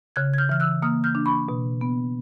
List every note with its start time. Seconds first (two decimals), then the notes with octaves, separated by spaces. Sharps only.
0.16 C#3 F#6 G#6
0.34 G#6
0.38 F6 G6
0.49 E3 F6
0.60 E6 F#6
0.82 A#3 D#6 F6
1.04 F6 G6
1.15 D4
1.26 B5 C#6
1.49 B2
1.81 B3